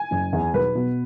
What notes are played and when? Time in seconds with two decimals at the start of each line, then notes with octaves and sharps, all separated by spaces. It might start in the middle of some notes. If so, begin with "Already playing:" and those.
Already playing: G#5
0.11 F#1
0.33 E2
0.53 B1 B4
0.75 B2